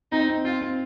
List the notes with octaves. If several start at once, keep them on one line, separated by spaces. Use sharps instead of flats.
C4 D#4
C4
C4 F4
C4